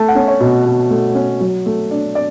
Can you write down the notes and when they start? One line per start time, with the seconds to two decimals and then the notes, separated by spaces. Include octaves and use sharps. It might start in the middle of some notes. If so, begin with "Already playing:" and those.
Already playing: A3 A5
0.08 F#5
0.15 C#4
0.28 C#5
0.40 B2
0.66 B2
0.90 A3
1.15 C#4
1.40 F#3
1.66 A3
1.91 D4
2.15 D5